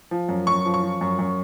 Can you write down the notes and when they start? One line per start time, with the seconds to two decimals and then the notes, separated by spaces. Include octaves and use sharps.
0.11 F3
0.29 F#2
0.47 F#2 C#6
0.65 F3
0.74 C#6
0.83 F3
1.01 F#2
1.19 F#2